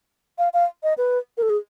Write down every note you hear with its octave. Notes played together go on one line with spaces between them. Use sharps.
F5
F5
D#5
B4
A#4
A4
G#4